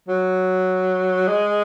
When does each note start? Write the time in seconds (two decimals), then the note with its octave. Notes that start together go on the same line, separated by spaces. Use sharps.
0.08 F#3
1.27 G#3